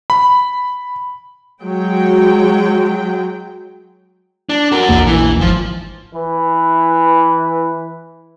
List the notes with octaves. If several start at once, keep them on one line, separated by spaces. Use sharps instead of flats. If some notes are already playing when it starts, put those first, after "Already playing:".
B5
F#3 G#3 G5
D4
F#4 A#4
A#1 E2 A#3
E3
G#1 F3
E3 B4